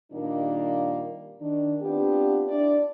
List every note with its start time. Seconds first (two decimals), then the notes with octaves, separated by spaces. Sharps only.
0.12 A#2 D#3 G3 A#3 D4 D#4
1.40 D#3 D4
1.80 B3 C4 D4 F4 G4
2.48 D4 E4 D5